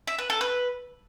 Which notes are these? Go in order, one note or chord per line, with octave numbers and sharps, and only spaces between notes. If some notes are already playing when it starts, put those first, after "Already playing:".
E5
B4
A4
B4